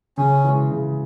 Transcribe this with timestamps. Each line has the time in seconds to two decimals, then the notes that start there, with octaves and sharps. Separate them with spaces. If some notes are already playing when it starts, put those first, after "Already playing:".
0.18 C#3 C#4
0.44 E3 G#3
0.71 C#3